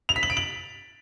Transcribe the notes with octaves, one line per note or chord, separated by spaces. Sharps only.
F7
B6
F#7
D7
F#7